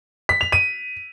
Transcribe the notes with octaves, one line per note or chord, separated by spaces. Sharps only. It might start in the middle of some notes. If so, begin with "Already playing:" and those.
B6
F7
D#7